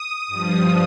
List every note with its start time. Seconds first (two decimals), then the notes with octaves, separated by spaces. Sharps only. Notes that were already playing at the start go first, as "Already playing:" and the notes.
Already playing: D#6
0.28 G2 F3